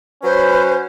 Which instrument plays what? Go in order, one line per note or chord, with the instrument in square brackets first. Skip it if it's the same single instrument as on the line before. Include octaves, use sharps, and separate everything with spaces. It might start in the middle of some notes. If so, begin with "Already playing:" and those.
[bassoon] F#3 [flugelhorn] C#4 [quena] B4 [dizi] C5